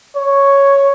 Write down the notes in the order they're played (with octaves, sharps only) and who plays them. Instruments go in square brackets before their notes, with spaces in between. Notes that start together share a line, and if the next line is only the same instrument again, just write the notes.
[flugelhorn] C#5